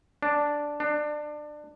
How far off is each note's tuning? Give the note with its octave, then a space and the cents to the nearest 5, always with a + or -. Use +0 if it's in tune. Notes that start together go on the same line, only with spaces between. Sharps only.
D4 +0
D4 +25